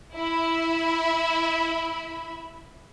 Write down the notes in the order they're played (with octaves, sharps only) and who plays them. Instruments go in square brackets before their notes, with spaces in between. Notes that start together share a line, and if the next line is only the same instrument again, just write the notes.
[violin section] E4 E5 B5